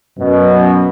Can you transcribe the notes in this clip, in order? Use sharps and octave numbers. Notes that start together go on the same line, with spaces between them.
F#2 B2